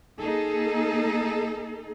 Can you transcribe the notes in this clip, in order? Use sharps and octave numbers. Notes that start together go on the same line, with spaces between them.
A#3 D#4 G#4 A4